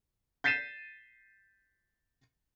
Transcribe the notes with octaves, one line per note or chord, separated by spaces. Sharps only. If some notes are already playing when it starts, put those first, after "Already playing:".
G6 A6 B6 C7 D#7 E7